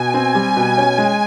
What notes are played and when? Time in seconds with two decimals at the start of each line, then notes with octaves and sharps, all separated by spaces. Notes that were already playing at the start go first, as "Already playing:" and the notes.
Already playing: B2 G#5
0.14 C4
0.35 G3
0.57 B2
0.78 C#4
0.98 G#3